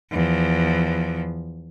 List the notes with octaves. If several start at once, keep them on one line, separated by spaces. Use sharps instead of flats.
E2 F3